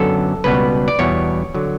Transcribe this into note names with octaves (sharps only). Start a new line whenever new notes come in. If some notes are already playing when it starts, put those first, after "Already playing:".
Already playing: F#2 D3 F#3 B3 A4
C#2 B2 G3 B3 B4
D5
E2 B2 G3 B3 C#5
D3 F#3